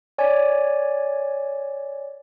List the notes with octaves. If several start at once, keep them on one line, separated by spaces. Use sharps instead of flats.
C#5 D5 G#5